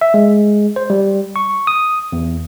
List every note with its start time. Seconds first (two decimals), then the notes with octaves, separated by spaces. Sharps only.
0.01 E5
0.14 G#3
0.76 C5
0.90 G3
1.36 C#6
1.67 D#6
2.12 E2